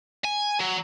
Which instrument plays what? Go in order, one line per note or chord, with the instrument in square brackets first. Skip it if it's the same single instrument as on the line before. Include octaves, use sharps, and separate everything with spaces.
[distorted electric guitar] G#5
F#3